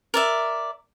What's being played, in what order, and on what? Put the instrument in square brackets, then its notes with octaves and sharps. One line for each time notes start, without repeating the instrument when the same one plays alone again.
[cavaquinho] A#4 D5 E5